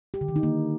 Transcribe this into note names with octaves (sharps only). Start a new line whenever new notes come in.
G4
D3
D#3
D#4
A#3